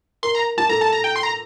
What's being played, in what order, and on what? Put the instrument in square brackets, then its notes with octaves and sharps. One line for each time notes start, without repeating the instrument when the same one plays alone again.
[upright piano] A#4 [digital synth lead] C6
[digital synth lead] A#5
[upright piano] G4 [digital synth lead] A5
[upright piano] A4 [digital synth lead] A#5
[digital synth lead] A5
A#5
G5
C6
A#5